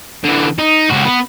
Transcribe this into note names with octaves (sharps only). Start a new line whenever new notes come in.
D3 E3
D#4
C#2 F#4
B3